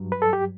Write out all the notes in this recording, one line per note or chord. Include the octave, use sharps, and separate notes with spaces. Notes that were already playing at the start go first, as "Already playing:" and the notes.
Already playing: G2 F#3
B4
A4
G4